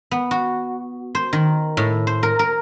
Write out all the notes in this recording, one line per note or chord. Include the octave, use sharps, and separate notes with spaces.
B3
F#4
C5
D#3
A2
C5
A#4
A#4